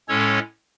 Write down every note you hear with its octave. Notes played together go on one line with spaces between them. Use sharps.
A2 G#3 C#4 A4 C#5